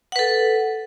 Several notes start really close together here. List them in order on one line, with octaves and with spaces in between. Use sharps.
F#5 B4 A4